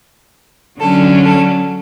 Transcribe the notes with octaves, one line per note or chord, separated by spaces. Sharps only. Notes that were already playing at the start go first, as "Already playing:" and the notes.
D3 F#3 C#4 A4
A4